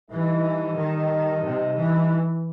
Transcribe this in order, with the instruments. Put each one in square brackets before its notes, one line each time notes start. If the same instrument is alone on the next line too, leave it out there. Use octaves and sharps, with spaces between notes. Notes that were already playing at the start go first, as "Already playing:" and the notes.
[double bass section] E3 [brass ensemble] G3 D#4 A4 D#5
[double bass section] D#3
C3
E3